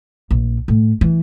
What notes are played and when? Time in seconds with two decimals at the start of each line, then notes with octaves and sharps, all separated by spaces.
0.31 A#1
0.68 A2
1.01 E3